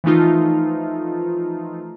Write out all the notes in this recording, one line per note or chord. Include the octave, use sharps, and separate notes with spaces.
E3 F3 A3 D#4 F4